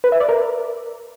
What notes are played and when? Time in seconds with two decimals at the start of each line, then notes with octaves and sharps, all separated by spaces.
0.04 B4
0.12 E5
0.20 D5
0.29 A#4